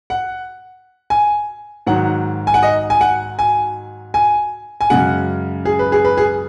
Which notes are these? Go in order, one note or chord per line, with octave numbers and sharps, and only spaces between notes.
F#5
G#5
G#2 D#3 F#3 F#5
G#5
F#5
D#5
G#5
F#5
G#5
G#5
G#5
F#2 C#3 G#3 F#5
G#4
B4
G#4
B4
G#4